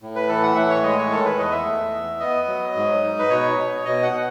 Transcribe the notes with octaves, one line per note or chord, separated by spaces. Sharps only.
A2
B4
E3 A4
F#5
A2 E5
C#5
G#3 D#5
C#5
D#3 A4
B4
E2 D#5
E5
A3
E2
B3 D#5
F#3
G#2
D#4
B4
B2 C#5
B2
B2 D#5
F#5
B2